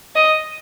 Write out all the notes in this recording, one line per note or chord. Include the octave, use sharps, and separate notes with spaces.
D#5